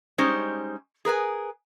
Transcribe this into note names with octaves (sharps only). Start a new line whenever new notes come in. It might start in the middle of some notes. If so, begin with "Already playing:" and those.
G3 G#3 C#4 D#4 C5
G#4 A#4 B4 G#5